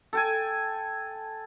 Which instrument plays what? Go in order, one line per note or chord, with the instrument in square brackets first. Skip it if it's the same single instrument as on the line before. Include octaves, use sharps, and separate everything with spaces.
[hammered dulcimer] A4 G5 G#5